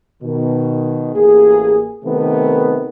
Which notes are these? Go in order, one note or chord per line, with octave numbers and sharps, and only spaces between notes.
B2 D#3
A1 A#3 G#4
C3 D#3 A3 B3